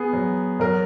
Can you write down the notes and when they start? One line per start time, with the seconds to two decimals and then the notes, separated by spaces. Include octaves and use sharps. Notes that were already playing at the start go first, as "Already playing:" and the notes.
Already playing: B3 G#4
0.13 F#3
0.60 F#3 A#4